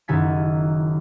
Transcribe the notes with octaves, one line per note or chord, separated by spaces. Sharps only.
F#1 D#3 E4 G#5 A6 B6